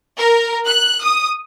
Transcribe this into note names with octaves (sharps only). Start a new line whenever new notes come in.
A#4
F#6
D#6